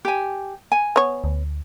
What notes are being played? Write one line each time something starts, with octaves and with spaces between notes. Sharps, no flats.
G4 G#5
G#5
B3 C#5
D2